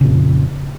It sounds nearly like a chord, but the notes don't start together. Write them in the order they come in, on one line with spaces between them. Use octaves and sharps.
C#3 A#2 F2